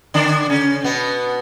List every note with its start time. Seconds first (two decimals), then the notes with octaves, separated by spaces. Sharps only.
0.14 D3 D4
0.49 C#3 C#4
0.84 B2 B3